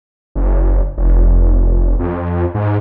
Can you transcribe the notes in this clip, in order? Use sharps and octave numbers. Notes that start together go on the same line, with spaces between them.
F#1
F1
F2
G#2